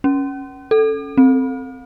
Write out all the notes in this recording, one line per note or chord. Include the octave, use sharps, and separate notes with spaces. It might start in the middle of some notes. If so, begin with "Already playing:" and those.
C#4
A4
C4